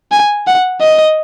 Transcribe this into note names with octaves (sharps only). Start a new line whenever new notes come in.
G#5
F#5
D#5